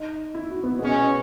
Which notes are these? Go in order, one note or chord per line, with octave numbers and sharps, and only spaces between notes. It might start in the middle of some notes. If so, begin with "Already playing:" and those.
Already playing: D#4
E4
F#4
B3
B2 G#3 B3 C#4